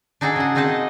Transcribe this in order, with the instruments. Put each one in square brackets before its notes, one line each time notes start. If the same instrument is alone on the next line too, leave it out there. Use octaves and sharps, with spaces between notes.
[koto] D4 D#4 F#4 G#4 A4 D5
C#3 F#5
A#3 C4 D#4 G#4 D#5 A5